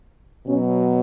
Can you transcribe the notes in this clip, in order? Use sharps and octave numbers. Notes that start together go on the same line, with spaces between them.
B2 F#3 C#4